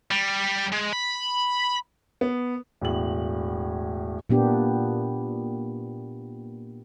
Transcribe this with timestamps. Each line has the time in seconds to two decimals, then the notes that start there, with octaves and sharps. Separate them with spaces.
0.11 G3
0.72 G#3
0.93 B5
2.21 B3
2.81 E1 A2 F#7
4.29 A#2 A#3 B3 D4 G4